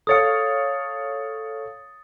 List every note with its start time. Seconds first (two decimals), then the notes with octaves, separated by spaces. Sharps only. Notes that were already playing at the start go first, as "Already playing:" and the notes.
0.07 A4 C#5 F5 D#6 A6 C#7